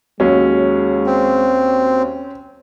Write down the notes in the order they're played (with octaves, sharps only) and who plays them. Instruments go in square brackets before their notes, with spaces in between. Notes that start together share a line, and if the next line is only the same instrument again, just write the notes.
[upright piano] D#2 F#3 [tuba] G#3 [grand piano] C#4
[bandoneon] C4